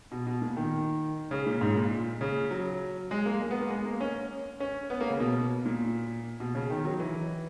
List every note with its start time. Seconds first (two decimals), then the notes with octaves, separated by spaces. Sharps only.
0.12 B2
0.27 B2
0.41 A#2
0.57 D#3
1.31 C#3
1.46 A#2
1.61 G#2
1.76 A#2
2.21 C#3
2.51 F#3
3.11 G#3
3.26 A#3
3.41 G#3
3.51 B3
3.60 A#3
3.70 G#3
3.85 A#3
4.00 C#4
4.60 C#4
4.90 B3
5.01 A#3
5.10 C#3
5.20 B2
5.65 A#2
6.40 B2
6.55 C#3
6.70 D#3
6.85 F#3
7.00 E3